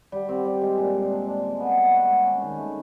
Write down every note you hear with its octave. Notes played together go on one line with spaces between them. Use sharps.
G3
C4
G3
G#3
A#2
G#3
D4
D4
G#3
B3
B3
F#4
G#3
C#4
D#3
A3